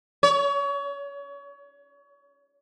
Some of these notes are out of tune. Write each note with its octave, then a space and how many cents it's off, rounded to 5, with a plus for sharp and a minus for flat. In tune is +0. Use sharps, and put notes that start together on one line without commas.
C#5 +30